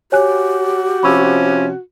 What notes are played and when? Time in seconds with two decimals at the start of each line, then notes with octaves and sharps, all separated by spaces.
0.12 F#4 G4 C#5 G#5 F#6
1.03 C3 F3 C#4 B5 C#6 E6